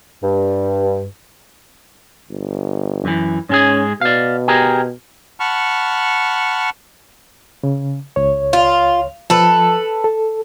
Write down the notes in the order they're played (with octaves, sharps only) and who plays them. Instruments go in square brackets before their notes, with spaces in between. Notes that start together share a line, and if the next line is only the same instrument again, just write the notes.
[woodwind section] G2
[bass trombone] G1
[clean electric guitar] F#2 E3
[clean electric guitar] G#2 G#3 G#4 [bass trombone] C#4
[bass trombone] B2 [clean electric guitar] D5 F5
[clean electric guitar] G4 G#4 A#4
[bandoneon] F#5 A5 B5 C#6 F6
[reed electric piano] C#3
C#2 C#5
[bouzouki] F4
[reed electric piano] F3 [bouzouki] A4 B4
[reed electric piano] A4